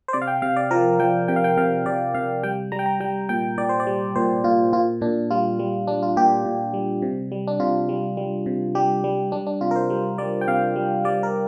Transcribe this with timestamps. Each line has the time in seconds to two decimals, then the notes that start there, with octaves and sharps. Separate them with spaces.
0.08 C5
0.13 C3 D5
0.22 F5
0.27 G5
0.42 C3 F5
0.56 D5
0.71 F3 A#4
0.99 F3 G5
1.28 C3 G5
1.36 F5
1.44 G5
1.57 C3 F5
1.86 C3 D5
2.14 C3 F5
2.43 G3 G5
2.72 G3 A#5
2.79 G5
2.86 A#5
3.00 G3 G5
3.29 A#2 G5
3.58 A#2 D5
3.69 C5
3.80 D5
3.87 G3
4.16 A#2 C5
4.44 A#2 F4
4.73 A#2 F4
5.01 A#2 D4
5.30 G3 F4
5.59 G3
5.88 G3 D4
6.03 F4
6.16 A#2 G4
6.45 A#2
6.74 G3
7.02 C3
7.32 G3
7.47 D4
7.60 C3 F4
7.89 G3
8.17 G3
8.46 C3
8.75 G3 G4
9.04 G3
9.32 G3 D4
9.47 D4
9.61 C3 F4
9.71 A#4
9.76 C5
9.90 G3
10.18 G3 D5
10.41 G5
10.47 C3 F5
10.76 G3
11.04 G3 D5
11.23 A#4